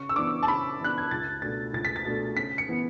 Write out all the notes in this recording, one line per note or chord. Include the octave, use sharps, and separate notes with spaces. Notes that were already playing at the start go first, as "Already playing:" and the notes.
Already playing: C#3 C#6
E6
E3 B3 D4 D6
A5
C#3 B5
E3 B3 D4 F#6
G#6
C#2 A6
B2 A3 D4 A6
C#2 A6
B6
A6
B2 A3 D4
C#3 B6
C#7
E3 B3